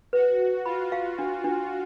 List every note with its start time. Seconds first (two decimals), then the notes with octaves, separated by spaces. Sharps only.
0.13 F#4 B4
0.39 B4
0.65 F4 B5
0.92 F5
1.19 D4
1.44 D4